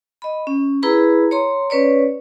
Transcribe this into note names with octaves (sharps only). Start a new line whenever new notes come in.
D#5 B5
C#4
E4 G#4 B4 A#5 B5
C#5 A#5 C6
C#4 B4 C#5 D5